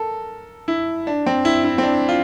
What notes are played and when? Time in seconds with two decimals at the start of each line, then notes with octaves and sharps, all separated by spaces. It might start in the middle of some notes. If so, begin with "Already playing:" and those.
Already playing: A4 A#4
0.68 E4
1.07 D4
1.26 C4
1.45 E4
1.64 E4
1.78 C4
1.83 D4
2.09 F4